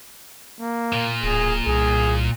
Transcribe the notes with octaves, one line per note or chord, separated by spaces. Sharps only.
A#3
A#2
D1 G#4
C2 G#4